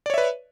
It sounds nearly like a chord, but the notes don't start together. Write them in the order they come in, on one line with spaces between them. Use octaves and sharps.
D5 C#5 E5 B4